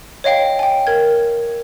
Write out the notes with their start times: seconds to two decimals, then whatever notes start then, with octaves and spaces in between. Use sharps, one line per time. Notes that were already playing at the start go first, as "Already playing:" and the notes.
0.24 C#5 D#5 F5 G5
0.59 G5 G#5
0.87 A#4 G#6